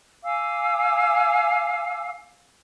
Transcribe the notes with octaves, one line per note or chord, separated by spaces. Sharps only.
F5 G#5 D6 E6